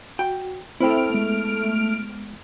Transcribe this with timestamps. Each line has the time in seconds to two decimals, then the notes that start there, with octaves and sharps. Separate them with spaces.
0.19 F#4 G5
0.80 A3 C4 E4 A4 C5 G5 F6 D7
1.10 G#3 B3